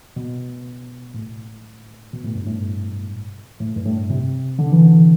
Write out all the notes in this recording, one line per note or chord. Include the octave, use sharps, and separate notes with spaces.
B2
A2
B2
A2
G2
A2
A2
G2
A2
C3
D3
E3
D3